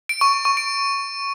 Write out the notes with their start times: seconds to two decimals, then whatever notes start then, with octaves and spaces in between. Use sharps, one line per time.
0.09 D7
0.21 C#6
0.33 D7
0.45 C#6
0.57 D7